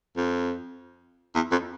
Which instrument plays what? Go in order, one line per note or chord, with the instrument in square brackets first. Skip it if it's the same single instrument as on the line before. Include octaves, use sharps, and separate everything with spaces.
[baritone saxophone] F2
E2
F2